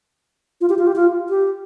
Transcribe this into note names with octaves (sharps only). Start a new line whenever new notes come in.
F4
G4
F4
G4
F4
G4